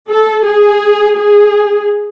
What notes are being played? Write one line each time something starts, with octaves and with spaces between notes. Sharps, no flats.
A4
G#4
G#4